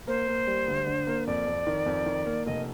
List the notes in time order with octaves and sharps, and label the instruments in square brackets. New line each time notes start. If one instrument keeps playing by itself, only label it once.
[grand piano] A#3 [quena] C5
[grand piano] A#3
G3
D2
D3
A#3
[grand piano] F2 [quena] D5
[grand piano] F2
D#3
F2
D#3
A#3
[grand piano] F1 [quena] D#5